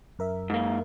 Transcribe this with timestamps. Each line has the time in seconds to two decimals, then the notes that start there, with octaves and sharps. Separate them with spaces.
0.19 F#2 A#4 E5
0.50 G#2 A#3